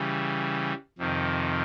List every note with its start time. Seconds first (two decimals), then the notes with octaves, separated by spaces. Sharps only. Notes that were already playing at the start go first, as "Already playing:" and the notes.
Already playing: C#3 E3 G3
0.98 F2 C3 D#3